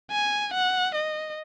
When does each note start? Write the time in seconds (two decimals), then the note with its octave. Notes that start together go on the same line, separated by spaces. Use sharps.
0.12 G#5
0.54 F#5
0.95 D#5